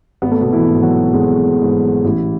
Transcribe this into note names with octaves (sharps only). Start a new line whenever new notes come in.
G#1 B3
A3
B2 B3
E3 E4
G#2 E3
F#3 F#4
G#1 G#3 G#4
G#2 E3
A1 E3 E4